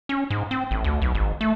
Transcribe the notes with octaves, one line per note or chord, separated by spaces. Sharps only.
C#4
G#2
C4
A1
D2
B1
G#1
A3